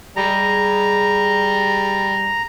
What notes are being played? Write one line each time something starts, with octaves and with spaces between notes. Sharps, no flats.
G3 G#3 A#5